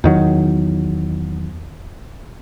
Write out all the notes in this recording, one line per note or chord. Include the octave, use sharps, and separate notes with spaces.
E2 D#3 F#3